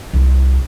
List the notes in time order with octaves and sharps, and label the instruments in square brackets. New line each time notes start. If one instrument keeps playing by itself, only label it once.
[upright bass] C2